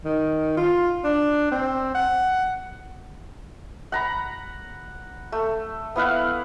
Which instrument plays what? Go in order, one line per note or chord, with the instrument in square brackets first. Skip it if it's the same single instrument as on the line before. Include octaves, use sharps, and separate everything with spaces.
[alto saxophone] D#3
F4
D4
C4
F#5
[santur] F#5 A#5 B5
A3
B3 E4 F5 F#5